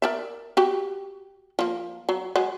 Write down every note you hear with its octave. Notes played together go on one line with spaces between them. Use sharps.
A#4 D5 E5
F#4 G4
F3 A#3
F#3
F#3 G#3